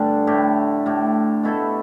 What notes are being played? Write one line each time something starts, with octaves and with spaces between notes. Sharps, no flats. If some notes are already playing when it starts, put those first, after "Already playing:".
Already playing: G2 D3 A3 D4
A2 A3 G4
A2 A3 G4
B2 A3 E4 A4